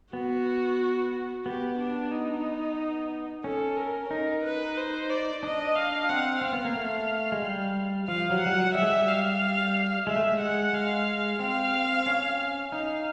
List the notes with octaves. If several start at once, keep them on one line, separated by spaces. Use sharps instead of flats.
B3 F#4
B3 G4
D4
D#4
C#4 A4
A#4
D#4 A#4
B4
C5
D5
D4 D#5
F5
C4 F#5
C4 F5
B3
A#3
A3
G#3
G3
F3 F5
F#3
G3 F#5
F#3
G3 E5
G#3
G3
F5
G#3 E5
A3
G#3
F#5
G#3 F5
C4 F5
C#4
D#4 F5